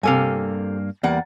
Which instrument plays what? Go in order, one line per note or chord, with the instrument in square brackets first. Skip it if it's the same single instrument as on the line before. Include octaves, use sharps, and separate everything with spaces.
[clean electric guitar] G2 A#3 F5 [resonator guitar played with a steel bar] C3 A4 G#5
[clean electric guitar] E2 [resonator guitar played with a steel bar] G3 A#3 F#5